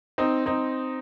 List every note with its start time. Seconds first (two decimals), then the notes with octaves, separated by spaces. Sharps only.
0.18 C4 D#4
0.46 C4 D#4